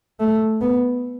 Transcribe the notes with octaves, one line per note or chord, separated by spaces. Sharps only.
A3
B3